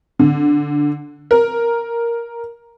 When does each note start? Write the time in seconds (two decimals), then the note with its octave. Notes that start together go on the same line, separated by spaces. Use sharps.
0.19 D3
1.31 A#4